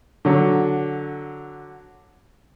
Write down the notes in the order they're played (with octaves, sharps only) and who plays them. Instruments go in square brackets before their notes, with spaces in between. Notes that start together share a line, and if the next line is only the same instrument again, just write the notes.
[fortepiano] D3 F#3